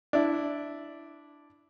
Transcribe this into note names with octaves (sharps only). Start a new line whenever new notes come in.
D4 E4